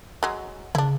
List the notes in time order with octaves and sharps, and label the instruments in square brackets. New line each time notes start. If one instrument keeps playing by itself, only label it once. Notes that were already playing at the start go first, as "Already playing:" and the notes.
[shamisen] F#3 G#3
[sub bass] C#3 [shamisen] D4 E4